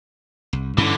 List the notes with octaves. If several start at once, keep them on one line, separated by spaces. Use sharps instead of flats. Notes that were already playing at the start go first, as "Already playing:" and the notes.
C2
G2 D3 E3 C#4